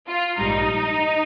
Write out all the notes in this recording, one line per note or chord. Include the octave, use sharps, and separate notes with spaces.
F4
A#1 G#2 G3 D#4